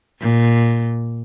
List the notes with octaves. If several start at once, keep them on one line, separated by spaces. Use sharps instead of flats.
A#2